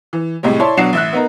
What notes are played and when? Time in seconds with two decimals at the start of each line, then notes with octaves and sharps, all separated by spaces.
0.13 E3
0.43 A2 C3 G3 G#3
0.59 E4 C#5 D5 A5 C6
0.77 B2 F#3 D4 F#5 C7 E7
0.93 A1 E5 F#6
1.13 B3 D#4 A#4